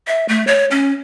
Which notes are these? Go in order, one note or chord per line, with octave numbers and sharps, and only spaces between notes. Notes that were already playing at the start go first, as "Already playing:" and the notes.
E5
A3
C#5
C#4